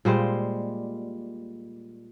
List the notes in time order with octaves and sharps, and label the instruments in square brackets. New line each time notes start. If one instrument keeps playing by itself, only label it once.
[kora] A#2 G3 G#3 C5